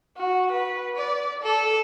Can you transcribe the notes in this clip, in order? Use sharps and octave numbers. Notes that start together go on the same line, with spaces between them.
F#4
B4
D5
A4